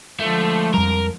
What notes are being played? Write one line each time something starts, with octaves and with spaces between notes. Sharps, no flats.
D3 F3 G#3 A3
F2 G3 A#4